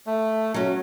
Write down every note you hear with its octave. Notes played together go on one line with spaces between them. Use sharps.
A3
F#3 C#4